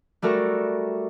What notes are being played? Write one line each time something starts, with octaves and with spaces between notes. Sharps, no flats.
G3 A3 F#4 A4 A#4